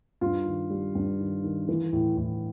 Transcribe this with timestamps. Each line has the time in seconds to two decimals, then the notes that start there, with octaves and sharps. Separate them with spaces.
0.21 G2 F4
0.46 D#3
0.70 G3
0.95 G2
1.20 D#3
1.44 D#3
1.69 E3
1.93 A2
2.17 A2